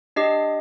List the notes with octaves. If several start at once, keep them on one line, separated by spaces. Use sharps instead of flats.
D4 G4 D#5